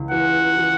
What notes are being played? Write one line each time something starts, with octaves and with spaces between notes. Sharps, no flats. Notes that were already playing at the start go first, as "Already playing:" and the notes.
Already playing: C#2 E3
E3 F#5
E3